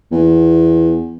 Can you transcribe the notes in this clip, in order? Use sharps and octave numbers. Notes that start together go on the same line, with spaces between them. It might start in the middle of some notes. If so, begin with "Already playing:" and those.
E2